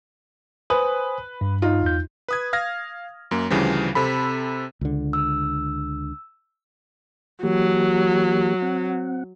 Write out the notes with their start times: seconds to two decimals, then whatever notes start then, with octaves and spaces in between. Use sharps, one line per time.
0.70 B4 C5 G#5 D#6
1.41 G2
1.62 D#4 F4
1.82 E2 G6
2.28 B4 D#6 G#6
2.53 F5 F6 G#6 A#6
3.31 F#2 A#3
3.50 D2 C#3 E3 F3 G3
3.95 C3 C4 A4 B5
4.81 C#2 D3
5.13 E6
7.43 E3 F#3 A#3 G4
8.62 C4 F#5